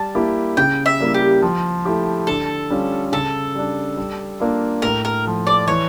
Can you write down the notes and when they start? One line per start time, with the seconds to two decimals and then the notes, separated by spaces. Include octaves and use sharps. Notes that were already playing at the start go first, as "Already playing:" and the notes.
Already playing: G3 A5
0.15 A#3 E4 G4
0.57 C#3 G5
0.86 E5
1.00 G3 A#3 E4
1.14 G4
1.42 F3
1.85 A3 E4 G4
2.27 D3 A4
2.70 G3 C#4 F4
3.12 C#3 A4
3.55 G3 D4
3.97 G3
4.40 A#3 D4 F4
4.82 A2 A#4
5.05 A#4
5.25 F3 A3
5.47 D5
5.67 E3 C#5